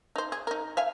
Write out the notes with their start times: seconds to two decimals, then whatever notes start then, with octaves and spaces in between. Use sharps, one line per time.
0.16 D#4 C5
0.32 G#4
0.47 D#4 A#4
0.77 E5 F5 G#5